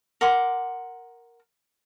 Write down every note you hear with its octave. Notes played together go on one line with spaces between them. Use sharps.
A#4 F#5 C6 D6